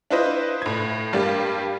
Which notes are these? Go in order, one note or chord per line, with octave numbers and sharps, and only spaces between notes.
D4 E4 F4 B4 C5 D#5
A2 G#6
G2 G3 A#3 D4 G4